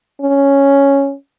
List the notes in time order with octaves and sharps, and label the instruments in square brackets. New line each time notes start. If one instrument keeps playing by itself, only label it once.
[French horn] C#4